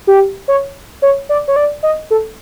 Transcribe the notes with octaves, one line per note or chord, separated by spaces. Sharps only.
G4
C#5
C#5
D5
C#5
D5
D#5
A4